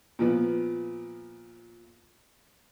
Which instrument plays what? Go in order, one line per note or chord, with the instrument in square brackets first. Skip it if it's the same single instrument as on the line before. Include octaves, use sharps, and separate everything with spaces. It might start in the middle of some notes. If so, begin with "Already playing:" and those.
[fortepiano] A#2 F3 B3